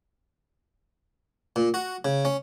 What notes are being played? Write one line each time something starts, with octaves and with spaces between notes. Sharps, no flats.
A#2
F#4
C#3
C#4